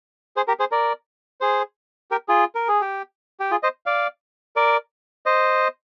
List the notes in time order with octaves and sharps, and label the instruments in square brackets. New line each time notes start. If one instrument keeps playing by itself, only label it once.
[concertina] G#4 C5
G4 A#4
G#4 C5
A#4 D5
G#4 C5
G4 A#4
F4 G#4
A#4
G#4
G4
G4
F4 G#4
C5 D#5
D5 F5
A#4 D5
C5 D#5